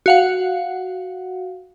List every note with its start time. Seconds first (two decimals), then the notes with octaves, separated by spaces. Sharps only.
0.06 F#4 F5 F#5